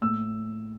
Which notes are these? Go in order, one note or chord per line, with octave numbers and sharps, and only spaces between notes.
A2 E6